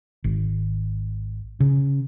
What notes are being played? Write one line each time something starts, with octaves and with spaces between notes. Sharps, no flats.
G#1
C#3